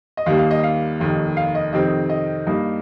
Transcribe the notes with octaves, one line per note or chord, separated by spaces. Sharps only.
D#5
D#2 D#3 G3 A#3 F5
F5
D#5
F5
F1 D#2 D#3
F5
D#5
F2 C3 D#3 C4 D#5
D#5
G2 G3 A#3 D#4